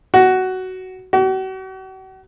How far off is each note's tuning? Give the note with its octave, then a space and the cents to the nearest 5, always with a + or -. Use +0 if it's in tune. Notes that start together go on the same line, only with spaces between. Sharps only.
F#4 +10
F#4 +40